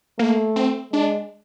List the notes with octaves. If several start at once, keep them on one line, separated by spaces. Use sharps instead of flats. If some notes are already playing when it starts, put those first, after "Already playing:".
A3 A#3
C4
G#3 D4